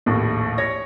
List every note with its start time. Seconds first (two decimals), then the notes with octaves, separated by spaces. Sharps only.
0.06 A#1 D#2 A2
0.58 C#5 A#6